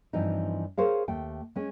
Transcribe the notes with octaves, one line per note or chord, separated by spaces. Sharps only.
G2 E3 F3 C4 D#4
G#4 A#4 C5 C#5 F5
D#2 A3 G5
G#3 C#4